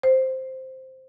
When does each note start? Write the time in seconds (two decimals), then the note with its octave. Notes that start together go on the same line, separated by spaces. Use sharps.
0.03 C5